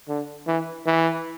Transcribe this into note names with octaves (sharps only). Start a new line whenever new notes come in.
D3
E3
E3